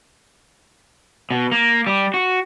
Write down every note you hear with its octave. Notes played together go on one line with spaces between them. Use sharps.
B2
A#3
G3
F#4